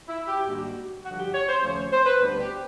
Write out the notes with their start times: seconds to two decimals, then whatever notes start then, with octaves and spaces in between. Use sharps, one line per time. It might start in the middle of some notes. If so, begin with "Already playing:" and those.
0.08 E4
0.28 G4
0.47 G#2 D#3 G3 A#3 D4 F#4
1.05 G2 D3 F3 F#4
1.19 G4
1.34 C#5
1.48 C5
1.63 D#2 C#3 F3 A3 C#4 C#5
1.77 C#5
1.92 C5
2.06 B4
2.21 D2 D3 G3 B3 D4 B4
2.40 G4